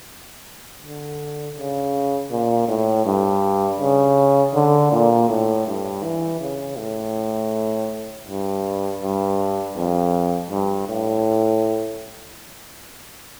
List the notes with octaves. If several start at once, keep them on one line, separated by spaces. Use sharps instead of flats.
D3
C#3
A#2
A2
G2
C#3
D3
A#2
A2
G2
E3
C#3
A2
G2
G2
F2
G2
A2